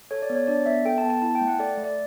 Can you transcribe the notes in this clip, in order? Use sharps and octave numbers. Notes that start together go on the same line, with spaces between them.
A4 C#5
D5
B3
C#5
D4 D5
B3 E5
A4 G5
A5
B3
A5
E4 A5
G5
A3
F#5
A4 D5
A3
D5